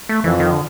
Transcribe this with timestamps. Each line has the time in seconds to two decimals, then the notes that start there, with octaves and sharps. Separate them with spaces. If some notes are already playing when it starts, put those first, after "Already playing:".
0.09 A3
0.24 F2 E3
0.40 D#3
0.51 D3